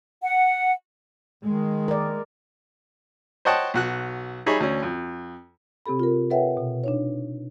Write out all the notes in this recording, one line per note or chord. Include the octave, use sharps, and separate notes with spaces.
F#5
D#3 G#3
A#4 D5
C5 C#5 D#5 F#5 G5 A5
B1 F#4 F#6
G3 D#4 G#4 C#5 E5 B5
D2 C#4
F2
C3 C4 G4 A4 B5
F4 A#4
A4 B4 C#5 E5 F#5 G5
B2
D4 D#4 C#5